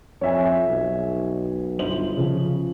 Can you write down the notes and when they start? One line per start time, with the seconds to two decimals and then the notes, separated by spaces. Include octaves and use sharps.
0.21 F2 C#5 E5 G#5
0.67 B1
1.79 G1 C5 F#7
2.17 C#3 F3